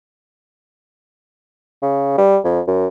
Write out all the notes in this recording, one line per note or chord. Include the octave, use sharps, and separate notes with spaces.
C#3
G3
F2
F#2